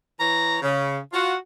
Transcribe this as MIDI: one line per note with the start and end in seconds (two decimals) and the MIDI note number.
0.19 0.58 52
0.19 0.58 73
0.19 0.58 82
0.62 0.97 49
1.12 1.36 65
1.12 1.36 66